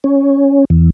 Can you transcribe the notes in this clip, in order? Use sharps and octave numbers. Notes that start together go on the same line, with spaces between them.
C#4
E2